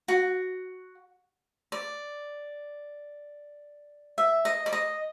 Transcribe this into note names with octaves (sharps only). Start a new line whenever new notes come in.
F#4
D5
E5
D#5
D5
D#5